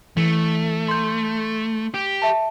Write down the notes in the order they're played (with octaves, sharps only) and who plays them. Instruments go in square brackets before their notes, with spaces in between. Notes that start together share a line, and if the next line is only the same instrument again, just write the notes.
[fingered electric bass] E3 [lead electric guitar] A3
[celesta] C6 G6
[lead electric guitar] G4
[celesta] E5 A5